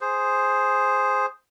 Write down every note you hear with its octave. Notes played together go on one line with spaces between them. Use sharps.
G#4 C5